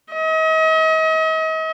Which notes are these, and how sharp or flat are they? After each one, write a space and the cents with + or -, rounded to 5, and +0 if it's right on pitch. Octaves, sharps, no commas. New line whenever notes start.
D#5 +40